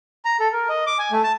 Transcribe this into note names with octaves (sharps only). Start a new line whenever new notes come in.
A#5
A4
A#4
D#5
D6
G#5
A3
A5